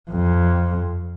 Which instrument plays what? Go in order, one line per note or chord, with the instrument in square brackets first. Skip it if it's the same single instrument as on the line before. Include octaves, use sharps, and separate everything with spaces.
[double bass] F2